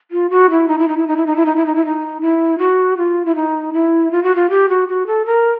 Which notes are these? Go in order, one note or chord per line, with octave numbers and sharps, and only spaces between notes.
F4
F#4
E4
D#4
E4
D#4
E4
D#4
E4
D#4
E4
D#4
E4
D#4
E4
D#4
E4
F#4
F4
E4
D#4
E4
F4
F#4
F4
G4
F#4
F#4
A4
A#4